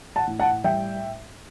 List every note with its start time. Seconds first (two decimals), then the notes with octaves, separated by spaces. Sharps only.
0.16 F#5 A5
0.27 A2
0.40 F#5 A5
0.64 G3 E5 G5